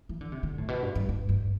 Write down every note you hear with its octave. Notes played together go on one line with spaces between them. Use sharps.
E3
D3
C3
D3
A2
B2
G2
G2
G2
G2